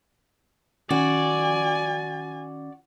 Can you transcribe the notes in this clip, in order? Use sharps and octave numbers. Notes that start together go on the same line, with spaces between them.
D#3 C#4 F#4 D5 G#5